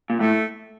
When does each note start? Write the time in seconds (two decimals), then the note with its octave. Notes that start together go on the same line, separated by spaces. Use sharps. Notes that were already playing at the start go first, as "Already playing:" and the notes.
0.10 A#2
0.20 A2 A3